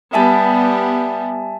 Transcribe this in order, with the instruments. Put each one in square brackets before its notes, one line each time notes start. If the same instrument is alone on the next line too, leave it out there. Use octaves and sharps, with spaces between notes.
[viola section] G3 B3 [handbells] E5 G#5 A5